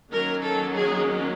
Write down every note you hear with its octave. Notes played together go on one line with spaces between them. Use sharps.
D#3 F#3 A#3 C#4 A#4
A4
G#4